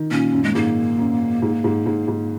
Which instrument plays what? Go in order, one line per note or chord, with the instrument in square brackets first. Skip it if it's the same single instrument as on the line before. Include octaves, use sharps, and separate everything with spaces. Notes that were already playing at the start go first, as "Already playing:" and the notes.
Already playing: [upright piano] D#3
[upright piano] A#2 [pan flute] C#4
[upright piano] F#2
[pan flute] G#3
[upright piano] G#2 [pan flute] A#3
[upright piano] F#2
G#2
G#2
G#2
G#2